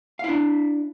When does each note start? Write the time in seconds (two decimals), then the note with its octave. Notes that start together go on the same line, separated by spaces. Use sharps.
0.19 F5
0.24 E4
0.28 D4